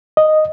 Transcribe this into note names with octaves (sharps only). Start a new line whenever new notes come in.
D#5